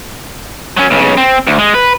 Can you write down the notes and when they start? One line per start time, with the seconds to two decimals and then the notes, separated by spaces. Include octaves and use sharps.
0.77 F#3 C#4
0.91 B1 C#3
1.17 C4
1.47 D2
1.59 G#3
1.74 B4